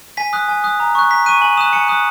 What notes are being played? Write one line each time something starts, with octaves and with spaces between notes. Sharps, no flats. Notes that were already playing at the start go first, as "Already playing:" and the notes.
G#5 B6
D#6 F#6
G#5
D#6 F#6
A#5
C#6 F#6
A#5 B6
C#6 F#6 D#7
G#5 F#7
D#6 F#6 E7
G#5 C#7
D#6 F#6